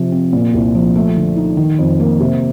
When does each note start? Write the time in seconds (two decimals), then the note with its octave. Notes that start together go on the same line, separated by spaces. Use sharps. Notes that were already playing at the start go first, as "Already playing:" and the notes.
Already playing: C3 F3
0.12 C4
0.33 A#2
0.54 C2
0.75 F3
0.95 A3
1.17 D3
1.36 D#4
1.57 D#3
1.79 F2
2.00 A#3
2.20 C3